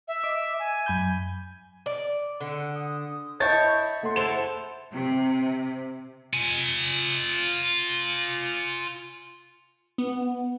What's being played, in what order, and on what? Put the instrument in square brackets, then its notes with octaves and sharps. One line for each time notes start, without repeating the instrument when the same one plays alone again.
[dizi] E5
[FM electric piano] D#5 D6
[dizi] G#5
[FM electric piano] F#2 B5 G6
[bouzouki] D5
[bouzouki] D3 [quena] F#5
[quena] D#6
[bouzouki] E4 C#5 [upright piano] D#5 A5 A6 [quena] G6
[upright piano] A3 C6 [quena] F#5
[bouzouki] E4 A4 C5 [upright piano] E7
[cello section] C3
[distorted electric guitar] F4 G#5
[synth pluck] B3